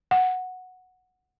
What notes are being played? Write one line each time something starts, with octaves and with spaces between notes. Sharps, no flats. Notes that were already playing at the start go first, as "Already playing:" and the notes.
F#5